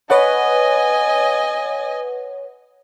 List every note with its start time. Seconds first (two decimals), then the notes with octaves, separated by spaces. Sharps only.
0.10 B4 C#5 D#5 F#5 G#5